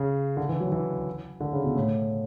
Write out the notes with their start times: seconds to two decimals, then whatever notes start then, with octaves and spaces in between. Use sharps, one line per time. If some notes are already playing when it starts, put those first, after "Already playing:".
Already playing: C#3
0.37 D3
0.49 E3
0.60 F#3
0.72 E3
1.40 D3
1.53 C#3
1.64 B2
1.76 A2